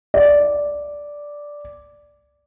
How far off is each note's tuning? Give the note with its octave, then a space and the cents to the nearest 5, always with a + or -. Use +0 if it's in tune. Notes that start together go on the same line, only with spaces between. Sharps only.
D5 -5